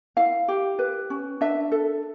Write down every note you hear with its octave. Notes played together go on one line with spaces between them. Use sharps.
E4 F5
G4
B4
C#4
D4 E5
A4